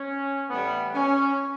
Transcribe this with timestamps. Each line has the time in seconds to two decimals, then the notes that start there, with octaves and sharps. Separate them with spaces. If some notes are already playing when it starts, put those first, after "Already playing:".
Already playing: C#4
0.50 A2 E3 G3 B3
0.94 C#4